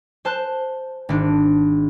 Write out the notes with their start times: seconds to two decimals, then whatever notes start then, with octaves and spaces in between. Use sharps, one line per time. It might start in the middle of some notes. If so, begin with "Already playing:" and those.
0.25 C5 A5 F#6
1.09 G#1 D4